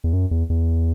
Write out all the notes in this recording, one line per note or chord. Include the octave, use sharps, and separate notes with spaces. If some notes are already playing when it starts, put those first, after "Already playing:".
E2
F#2
E2
E2